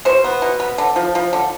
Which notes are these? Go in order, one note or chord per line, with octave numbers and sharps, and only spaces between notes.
B2 C5
B3
B2
B3
D3
F3
F3
D3